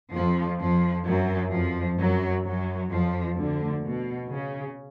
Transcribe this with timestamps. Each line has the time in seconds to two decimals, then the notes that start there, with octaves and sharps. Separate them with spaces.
0.13 F2 F3
0.59 F2 F3
1.05 F#2 F#3
1.51 F2 F3
1.98 F#2 F#3
2.44 F#2 F#3
2.89 F2 F3
3.35 D2 D3
3.82 B2
4.29 C#3